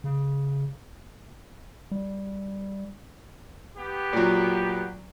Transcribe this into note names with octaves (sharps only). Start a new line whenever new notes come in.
C#3
G3
B3 G4
A#2 F#3